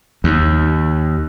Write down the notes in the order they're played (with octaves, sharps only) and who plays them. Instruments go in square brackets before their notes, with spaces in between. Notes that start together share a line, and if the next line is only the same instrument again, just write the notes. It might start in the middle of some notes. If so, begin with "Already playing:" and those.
[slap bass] D#2